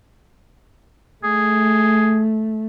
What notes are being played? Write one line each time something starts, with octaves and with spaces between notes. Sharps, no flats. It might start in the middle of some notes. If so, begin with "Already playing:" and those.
A3 G#4